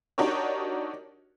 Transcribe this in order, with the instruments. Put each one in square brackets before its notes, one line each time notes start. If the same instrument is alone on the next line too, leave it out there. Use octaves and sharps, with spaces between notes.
[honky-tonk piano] D4 D#4 F#4 G4 A#4 C#5